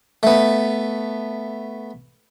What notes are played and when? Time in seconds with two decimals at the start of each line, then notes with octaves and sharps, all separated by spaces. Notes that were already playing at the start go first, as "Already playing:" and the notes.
0.23 A3 B3